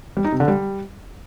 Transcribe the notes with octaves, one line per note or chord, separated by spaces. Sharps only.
G3
D#4
C3
D3
G3